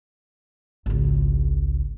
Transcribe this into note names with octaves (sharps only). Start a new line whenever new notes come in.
G#1 C#2